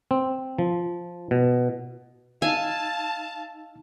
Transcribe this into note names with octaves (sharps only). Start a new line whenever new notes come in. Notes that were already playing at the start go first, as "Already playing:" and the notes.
C4
F3
B2
D#4 F5 G#5 A5 E6